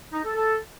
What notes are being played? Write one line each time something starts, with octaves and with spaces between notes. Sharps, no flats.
D#4
A4
A4